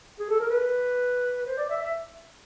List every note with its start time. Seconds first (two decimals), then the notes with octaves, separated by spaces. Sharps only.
0.19 G#4
0.30 A4
0.40 A#4
0.50 B4
1.46 C5
1.57 D5
1.70 E5
1.82 E5